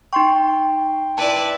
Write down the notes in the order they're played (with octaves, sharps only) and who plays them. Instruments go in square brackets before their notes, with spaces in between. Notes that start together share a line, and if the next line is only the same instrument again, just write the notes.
[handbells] D#4 C#6 [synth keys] G5 C6
[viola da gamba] E4 B4 D5 [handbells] A5